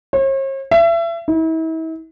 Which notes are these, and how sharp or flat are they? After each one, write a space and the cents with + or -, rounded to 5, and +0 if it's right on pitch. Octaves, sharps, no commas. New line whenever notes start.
C#5 -45
E5 +30
E4 -40